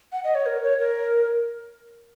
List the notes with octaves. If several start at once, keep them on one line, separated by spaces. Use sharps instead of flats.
F#5
D#5
C#5
A#4
C#5
A#4